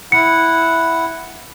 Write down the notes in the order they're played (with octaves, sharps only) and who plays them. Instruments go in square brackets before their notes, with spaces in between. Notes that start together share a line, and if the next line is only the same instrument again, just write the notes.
[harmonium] E4 F#5 [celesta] C#7